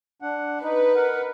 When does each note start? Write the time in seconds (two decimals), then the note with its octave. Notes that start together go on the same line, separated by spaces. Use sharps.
0.22 D4 F#5
0.63 D#4 B4
0.95 A#4 F#5